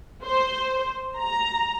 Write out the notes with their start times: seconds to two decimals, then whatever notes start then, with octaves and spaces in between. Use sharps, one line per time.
0.24 C5
1.17 A#5